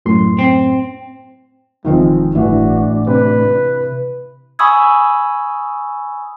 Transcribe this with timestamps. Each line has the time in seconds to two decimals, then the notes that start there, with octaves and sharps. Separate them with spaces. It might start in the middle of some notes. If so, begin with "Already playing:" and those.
0.06 F#2 A2 C6
0.39 C4
1.85 E1 D#3 F3 G#3 C4
2.35 G1 A2 E3 D4 F#4
3.07 C3 B4
4.59 G#5 B5 C#6 D#6 E6 G#6